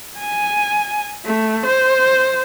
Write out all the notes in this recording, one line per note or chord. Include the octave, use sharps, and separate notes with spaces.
G#5
A3
C5